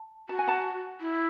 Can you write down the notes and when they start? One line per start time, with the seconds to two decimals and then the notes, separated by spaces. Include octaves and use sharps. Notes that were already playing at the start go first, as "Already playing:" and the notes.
Already playing: A5
0.29 F#4 A5
0.39 G#5
0.47 F#5 A5
1.00 E4